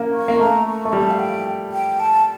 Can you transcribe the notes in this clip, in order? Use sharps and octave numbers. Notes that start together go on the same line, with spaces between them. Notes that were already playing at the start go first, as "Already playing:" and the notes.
Already playing: A#3 C#4
C#6
A#3
A3 A#5
C#6
A3
G3 A5
F5
G5
G5
A5